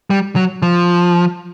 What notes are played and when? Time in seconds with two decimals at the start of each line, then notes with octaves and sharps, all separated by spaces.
0.10 G3
0.36 F#3
0.62 F3